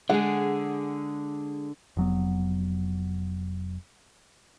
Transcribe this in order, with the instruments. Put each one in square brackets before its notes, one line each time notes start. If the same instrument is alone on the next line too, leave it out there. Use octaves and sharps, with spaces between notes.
[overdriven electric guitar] D3 [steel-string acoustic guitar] G#3 G#4 [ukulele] F#5
[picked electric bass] F1 F#3 B3